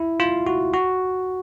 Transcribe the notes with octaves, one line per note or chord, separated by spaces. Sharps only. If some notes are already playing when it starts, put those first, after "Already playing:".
Already playing: E4
F4
F#4
F#4